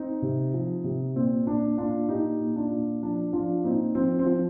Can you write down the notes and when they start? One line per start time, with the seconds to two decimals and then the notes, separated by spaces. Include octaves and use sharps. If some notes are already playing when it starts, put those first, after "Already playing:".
Already playing: C4 D#4
0.22 C3
0.54 F3
0.84 C3
1.16 A#2 C4
1.47 A#2 D4
1.78 A#2 D4 F4
2.08 A#2 D#4 G4
2.40 A#2
2.56 D4 F4
2.71 A#2
3.02 F3 D4
3.33 F3 D4 F4
3.64 A#2 C4 D#4
3.95 F3 C4
4.19 C4
4.26 F3